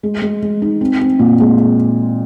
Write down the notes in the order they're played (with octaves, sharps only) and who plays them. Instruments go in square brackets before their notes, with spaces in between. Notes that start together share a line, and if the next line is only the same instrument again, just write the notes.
[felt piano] G#3
G#3
G#3
D#4
C4
C4
A#2
G#3